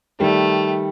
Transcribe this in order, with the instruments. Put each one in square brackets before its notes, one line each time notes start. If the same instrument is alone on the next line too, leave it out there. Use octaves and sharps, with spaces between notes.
[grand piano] D#3 G3 [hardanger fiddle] A3